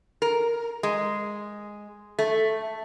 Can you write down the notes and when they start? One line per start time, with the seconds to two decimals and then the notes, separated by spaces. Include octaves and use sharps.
0.22 A#4
0.83 G#3
2.19 A3